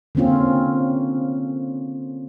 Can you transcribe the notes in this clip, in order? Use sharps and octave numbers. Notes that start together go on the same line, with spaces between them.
D3 A#3 C4 C#4 F4